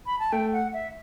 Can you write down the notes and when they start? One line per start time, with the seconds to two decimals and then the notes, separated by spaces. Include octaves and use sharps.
0.06 B5
0.19 A5
0.32 A3 G5
0.53 F#5
0.73 E5